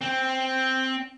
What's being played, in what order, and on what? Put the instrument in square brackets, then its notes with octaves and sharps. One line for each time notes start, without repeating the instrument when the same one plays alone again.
[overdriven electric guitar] C4